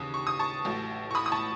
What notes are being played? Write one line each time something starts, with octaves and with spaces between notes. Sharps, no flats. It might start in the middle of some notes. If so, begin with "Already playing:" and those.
Already playing: D#2 C#3 E3 D#6
C#6
D#6
A5 C#6
A1 A2 F#3
C#6
B5 D#6
D#6
A5 C#6